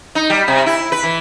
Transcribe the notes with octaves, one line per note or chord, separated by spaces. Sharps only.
D#4
G3
C3
E4
B4
E3